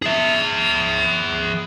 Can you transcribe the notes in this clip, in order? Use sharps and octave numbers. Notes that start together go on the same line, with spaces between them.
G#4 E5